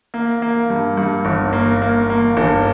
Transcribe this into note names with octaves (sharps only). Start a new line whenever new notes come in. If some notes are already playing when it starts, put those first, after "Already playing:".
A#3
A#3
G2
G2
G1
A#3
A#3
A#3
G1